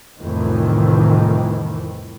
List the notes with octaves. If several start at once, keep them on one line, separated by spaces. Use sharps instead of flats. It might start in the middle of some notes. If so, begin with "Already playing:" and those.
C2 F2 A2 D#3 E3